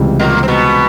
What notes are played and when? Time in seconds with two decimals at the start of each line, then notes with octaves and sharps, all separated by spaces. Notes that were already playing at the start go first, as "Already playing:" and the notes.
Already playing: C#2 C3 E3 G3
0.20 A#2 A#3
0.43 C4
0.48 B2 B3